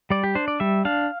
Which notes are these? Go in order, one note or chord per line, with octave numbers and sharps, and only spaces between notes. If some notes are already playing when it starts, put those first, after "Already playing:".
G3 D5
G4
D4 C5
D5
G3 E5
D4 F5